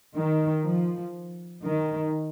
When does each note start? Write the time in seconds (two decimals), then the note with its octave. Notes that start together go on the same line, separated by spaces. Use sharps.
0.15 D#3
0.65 F3
1.65 D#3